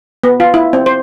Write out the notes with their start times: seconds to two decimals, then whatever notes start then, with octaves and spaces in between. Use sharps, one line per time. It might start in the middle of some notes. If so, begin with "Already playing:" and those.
0.24 B3
0.40 F4
0.54 E4
0.73 C4
0.86 C5